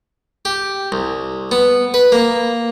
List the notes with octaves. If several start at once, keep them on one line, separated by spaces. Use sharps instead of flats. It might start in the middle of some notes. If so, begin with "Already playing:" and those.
G4
C2
B3
B4
A#3